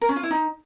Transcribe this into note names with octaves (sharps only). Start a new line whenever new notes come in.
A#4
C#4
F4
E4
D#4